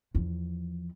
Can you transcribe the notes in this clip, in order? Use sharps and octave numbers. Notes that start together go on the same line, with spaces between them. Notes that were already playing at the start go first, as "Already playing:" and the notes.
E2 F3